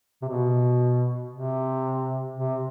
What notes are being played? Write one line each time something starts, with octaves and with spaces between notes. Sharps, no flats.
C3
B2
C3
C3